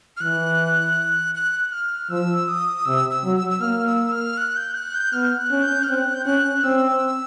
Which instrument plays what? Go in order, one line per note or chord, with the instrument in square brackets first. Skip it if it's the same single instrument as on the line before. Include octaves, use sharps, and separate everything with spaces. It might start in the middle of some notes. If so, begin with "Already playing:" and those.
[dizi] F6
[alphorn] E3 [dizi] F#6
[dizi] F#6
F6
[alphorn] F3 [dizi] E6
[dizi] D#6
[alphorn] C3 [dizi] E6
[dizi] E6
[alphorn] F#3
[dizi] E6
E6
[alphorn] A#3 [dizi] F6
[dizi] E6
F6
F#6
G6
F#6
G6
[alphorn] B3 [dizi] F6
[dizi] F#6
[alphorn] C#4
[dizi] G6
F6
[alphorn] C4 [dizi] F#6
[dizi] G6
[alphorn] C#4 [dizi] F#6
[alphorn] C4 [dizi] E6